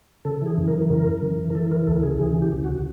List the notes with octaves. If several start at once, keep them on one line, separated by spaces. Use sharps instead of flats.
C#3 A4
E3 G#4
F#2
A#4
E3
C#3 A#4
F#2
E3
E3
A#4
E3 A4
E3 A#4
D2 A4
C#3 G#4
E3 G#4
C#3
G4
D2
F#4
C#3